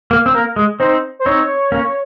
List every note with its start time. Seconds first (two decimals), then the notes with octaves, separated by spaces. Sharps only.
0.11 A#3
0.26 C4
0.34 A#3 A#4
0.56 G#3
0.79 C4 D#4 C5
1.19 C5
1.26 C4 D#4 C#5
1.72 A#3 C#4